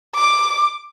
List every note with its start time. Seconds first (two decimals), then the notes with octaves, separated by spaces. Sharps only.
0.15 D6